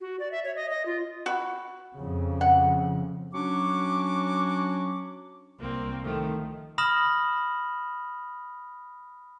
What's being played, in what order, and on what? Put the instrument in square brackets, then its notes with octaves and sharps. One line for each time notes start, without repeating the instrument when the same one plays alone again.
[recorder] F#4
D5
E5
C#5
D#5
D#5
F4
[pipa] F#4 B5
[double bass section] F2 C#3
[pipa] F#5
[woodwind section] F#3 C#4 D4 F#4 C#6 D6
[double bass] C2 [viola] A#3 C4
[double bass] D#3 [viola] F3 A3
[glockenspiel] B5 D#6 F6 A#6 E7 F#7